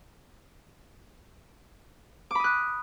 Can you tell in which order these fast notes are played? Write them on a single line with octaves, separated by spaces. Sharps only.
D6 B5 D#6 F#6